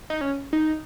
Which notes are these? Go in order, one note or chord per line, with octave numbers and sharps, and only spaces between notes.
D#4
C#4
D#4